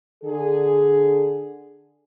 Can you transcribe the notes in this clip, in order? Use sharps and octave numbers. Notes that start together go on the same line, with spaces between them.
D3 G#4